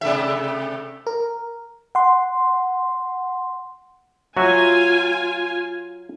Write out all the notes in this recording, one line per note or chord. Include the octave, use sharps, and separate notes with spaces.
C3 A3 E5
A#4
F#5 C6
F#3 F4 F#4 E5 G#5